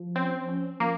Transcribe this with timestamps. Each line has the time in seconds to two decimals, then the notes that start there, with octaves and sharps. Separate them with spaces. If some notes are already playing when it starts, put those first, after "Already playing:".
Already playing: F3
0.16 C4 C#4
0.48 C#4
0.80 F3 A#3